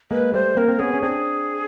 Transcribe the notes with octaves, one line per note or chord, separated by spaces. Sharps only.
G#3 A#3 B4
G3 A3 C5
A#3 C4 A#4
C4
B3 C#4 G#4
C#4
C4 D4 G#4